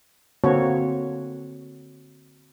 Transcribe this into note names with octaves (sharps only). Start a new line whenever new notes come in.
D3 A#3 C4 F#4 C#5